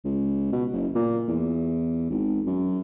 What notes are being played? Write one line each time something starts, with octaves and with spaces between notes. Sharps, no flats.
C#2
B2
F#1
A#2
E2
G#1
F#2